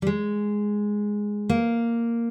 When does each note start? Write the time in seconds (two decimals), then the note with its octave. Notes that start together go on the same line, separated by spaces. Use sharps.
0.02 G3
0.07 G#3
1.49 A#3